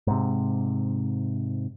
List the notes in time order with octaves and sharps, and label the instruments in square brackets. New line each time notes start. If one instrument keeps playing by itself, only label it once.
[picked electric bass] G#2 C3